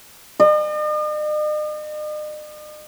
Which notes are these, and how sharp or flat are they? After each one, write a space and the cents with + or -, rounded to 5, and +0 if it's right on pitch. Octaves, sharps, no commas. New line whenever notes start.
D#5 -45